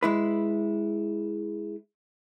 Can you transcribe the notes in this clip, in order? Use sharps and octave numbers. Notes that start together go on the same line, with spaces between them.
G#3 E4 B4